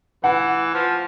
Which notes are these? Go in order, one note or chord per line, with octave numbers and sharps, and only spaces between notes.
E3 F#5
F3